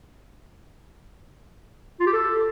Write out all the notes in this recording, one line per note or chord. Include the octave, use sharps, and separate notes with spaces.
F4
G4
A4